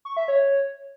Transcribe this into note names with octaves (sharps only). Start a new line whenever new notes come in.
C#6
E5
C#5